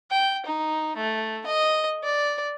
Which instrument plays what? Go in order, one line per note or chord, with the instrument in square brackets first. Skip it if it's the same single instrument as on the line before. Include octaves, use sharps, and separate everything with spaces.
[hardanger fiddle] G5
D#4
A3
D#5
D5